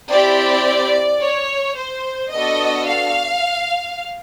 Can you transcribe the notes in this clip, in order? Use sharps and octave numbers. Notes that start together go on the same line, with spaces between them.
C4 E4 G4 D5
C#5
C5
B3 D4 F#4 A4 D#5
F5